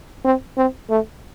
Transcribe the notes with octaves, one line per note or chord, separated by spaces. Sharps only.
C4
C4
A3